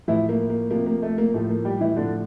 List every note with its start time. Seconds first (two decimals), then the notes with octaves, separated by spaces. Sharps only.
0.08 A2 E3 F3 E4
0.29 A#3
0.50 A#3
0.70 C3 F3 A#3
0.86 A#3
1.02 A3
1.18 A#3
1.34 A2 F3 A3
1.50 A#3
1.65 G3 G4
1.81 E3 E4
1.96 A2 D3 F3 D4